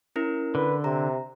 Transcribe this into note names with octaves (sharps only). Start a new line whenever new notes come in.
C#4 E4 A#4
D3 B4
C3 A#5